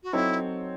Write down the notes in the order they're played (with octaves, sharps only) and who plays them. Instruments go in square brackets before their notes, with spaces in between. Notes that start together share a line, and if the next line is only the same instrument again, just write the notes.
[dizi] F#4
[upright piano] F#3 C4 D#4 A4 C#5 [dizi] E4